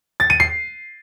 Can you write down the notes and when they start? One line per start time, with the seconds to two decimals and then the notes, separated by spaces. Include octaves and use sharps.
0.20 A6
0.30 D#7
0.40 C7